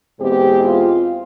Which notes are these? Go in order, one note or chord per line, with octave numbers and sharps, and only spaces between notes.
E2 B2 G#3 C4 G4
F4